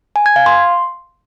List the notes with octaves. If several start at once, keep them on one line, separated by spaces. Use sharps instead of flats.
G#5
G#6
F5
C6